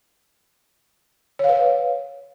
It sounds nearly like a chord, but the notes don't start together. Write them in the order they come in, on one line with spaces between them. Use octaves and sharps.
C#5 F5 B4